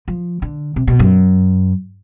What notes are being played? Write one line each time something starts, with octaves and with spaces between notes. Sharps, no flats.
F3
D3
C3
B2
F#2